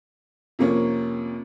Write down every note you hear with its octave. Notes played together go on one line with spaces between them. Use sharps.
F2 C3 A#3 C#4